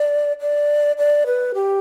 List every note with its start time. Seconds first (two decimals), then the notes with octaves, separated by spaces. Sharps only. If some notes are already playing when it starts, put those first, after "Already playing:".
Already playing: D5
0.41 D5
0.98 D5
1.26 B4
1.55 G4